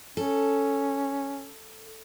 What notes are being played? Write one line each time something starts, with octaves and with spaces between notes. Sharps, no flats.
C#4 A4